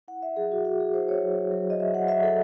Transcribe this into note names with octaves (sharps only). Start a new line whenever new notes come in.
E4 F#5
E5
F#3 G#4
F#4
F#3 F#4
G#4
E4 C5
C#5
F#3
F#3
D#5
F#3 E5
F#5
F#3 E5
A4